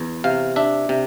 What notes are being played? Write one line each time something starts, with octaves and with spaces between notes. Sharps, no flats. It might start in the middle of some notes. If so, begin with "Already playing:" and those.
Already playing: E2
C3 F5
D4 E5
C3